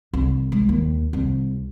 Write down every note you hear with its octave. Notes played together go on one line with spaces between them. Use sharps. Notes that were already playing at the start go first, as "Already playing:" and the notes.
C2
G#3
D#2
C2